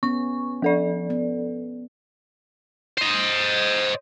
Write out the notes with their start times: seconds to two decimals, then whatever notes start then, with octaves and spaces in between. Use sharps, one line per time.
0.03 B3 C#4 C#6
0.62 F3 A4 D5
1.10 B3
2.98 C5 D#5